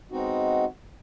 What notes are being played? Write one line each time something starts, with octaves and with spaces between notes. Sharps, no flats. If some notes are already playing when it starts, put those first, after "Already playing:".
G#3 B3 C4 D#4 F#4